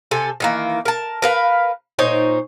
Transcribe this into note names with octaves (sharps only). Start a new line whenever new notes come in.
C3 A4 G#5
D#3 E3 A#3
A#4 A5
A#4 B4 F5
A#2 D#4 C5 C#5